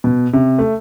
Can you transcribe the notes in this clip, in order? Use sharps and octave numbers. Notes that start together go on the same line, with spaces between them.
B2
C3
A3